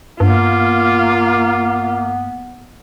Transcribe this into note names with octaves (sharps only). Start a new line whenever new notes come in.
G2 A#3 B3 F4